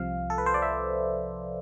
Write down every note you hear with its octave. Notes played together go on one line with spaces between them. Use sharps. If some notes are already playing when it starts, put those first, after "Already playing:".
Already playing: C2 C3 F3 F5
A4
B4
C5
D5
E5